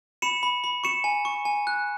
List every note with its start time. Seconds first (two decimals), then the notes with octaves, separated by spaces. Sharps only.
0.22 B5 C#7 E7
0.43 B5
0.64 B5
0.84 C#6 C#7 E7
1.04 G#5
1.25 C#6
1.45 G#5
1.67 F#6